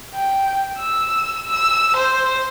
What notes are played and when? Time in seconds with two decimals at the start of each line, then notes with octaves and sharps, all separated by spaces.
0.15 G5
0.79 E6
1.47 E6
1.97 C5